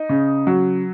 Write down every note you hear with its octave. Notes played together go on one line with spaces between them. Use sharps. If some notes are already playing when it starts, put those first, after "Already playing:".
Already playing: D#4
C#3
F#3